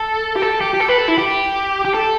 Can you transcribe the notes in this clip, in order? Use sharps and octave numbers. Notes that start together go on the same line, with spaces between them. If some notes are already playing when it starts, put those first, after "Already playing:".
Already playing: A4
G4
A4
G4
G4
A4
B4
A4
E4
G4
G4
A4